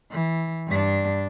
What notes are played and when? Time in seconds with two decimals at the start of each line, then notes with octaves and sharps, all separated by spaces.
0.11 E3
0.68 G2 D4